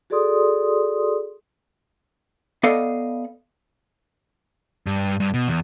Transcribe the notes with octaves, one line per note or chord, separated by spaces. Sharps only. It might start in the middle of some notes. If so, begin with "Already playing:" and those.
F#4 G#4 A4 D5 C6 D#6
B3 A4 D5 D#5 F5
G2
G2
B2
E2